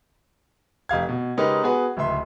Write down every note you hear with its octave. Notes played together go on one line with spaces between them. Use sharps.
F1 G4 F5 G#6
B2
C#3 G#3 D#4 G4 A#4 B4
B3 F#4 G#4 B4
D1 C#2 E5 C6